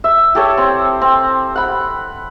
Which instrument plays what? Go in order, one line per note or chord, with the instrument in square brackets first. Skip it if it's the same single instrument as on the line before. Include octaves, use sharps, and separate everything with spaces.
[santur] E5
G4 A4 C#5
C4
C4
F#5 B5